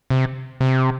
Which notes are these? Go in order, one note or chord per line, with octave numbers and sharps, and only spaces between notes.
C3
C3